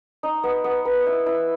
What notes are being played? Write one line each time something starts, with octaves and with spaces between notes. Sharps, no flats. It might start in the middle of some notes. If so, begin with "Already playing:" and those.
D#4
B3
B3
B4
E4
E4